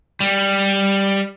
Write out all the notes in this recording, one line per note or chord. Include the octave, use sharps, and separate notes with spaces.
G3